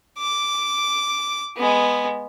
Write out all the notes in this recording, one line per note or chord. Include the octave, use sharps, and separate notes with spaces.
D6
G#3 B3